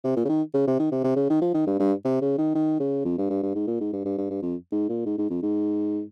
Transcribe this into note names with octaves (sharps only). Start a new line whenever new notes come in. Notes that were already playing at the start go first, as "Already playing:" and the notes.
C3
A#2
C#3
D#3
C#3
C3
D#3
C3
C3
C#3
D#3
F3
D#3
G2
G2
C3
C#3
D#3
D#3
C#3
F2
G2
G2
G2
G#2
A#2
G#2
G2
G2
G2
G2
F2
G#2
A#2
G#2
G#2
F2
G#2